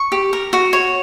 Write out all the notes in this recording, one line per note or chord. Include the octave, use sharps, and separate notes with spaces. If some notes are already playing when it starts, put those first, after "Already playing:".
Already playing: C#6
G4
A#4
F#4
C#5